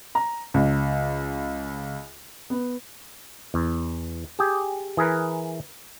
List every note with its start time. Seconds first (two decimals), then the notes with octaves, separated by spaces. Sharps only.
0.15 A#5
0.54 C#2
2.50 B3
3.54 E2
4.39 G4 G#4
4.97 E3 G#4 A#4 B4